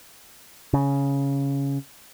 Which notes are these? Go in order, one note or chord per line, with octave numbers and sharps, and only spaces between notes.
C#3